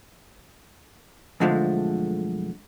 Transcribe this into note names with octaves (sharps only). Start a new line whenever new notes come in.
B1 F2 D3 F3 G#3 A3